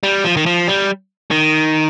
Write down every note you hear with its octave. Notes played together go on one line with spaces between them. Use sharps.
G3
F3
D#3
F3
G3
D#3